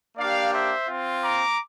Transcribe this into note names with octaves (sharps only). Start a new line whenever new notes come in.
A#3 D4 G4 D5 F5
C5 E5
C4 F4
A#5 D6